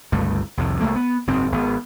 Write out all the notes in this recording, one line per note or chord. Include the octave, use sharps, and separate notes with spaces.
G1 C#2 G2 A3
C2 F2 A2 D#3
C2 F2 A3 A#3
B3
F#1 G#2 C4
G#1 B3